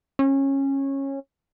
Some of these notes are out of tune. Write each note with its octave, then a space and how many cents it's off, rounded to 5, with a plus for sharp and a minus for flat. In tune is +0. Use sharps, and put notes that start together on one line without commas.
C#4 -20